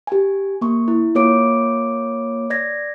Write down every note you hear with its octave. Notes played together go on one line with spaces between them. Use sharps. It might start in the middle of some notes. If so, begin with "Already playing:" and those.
G4 G#5
A#3 C#6
E4
A#3 F4 C#5 D6 D7
D5 G#6 A#6